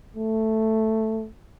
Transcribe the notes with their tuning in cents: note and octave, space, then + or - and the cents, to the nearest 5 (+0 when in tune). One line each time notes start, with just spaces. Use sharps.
A3 +5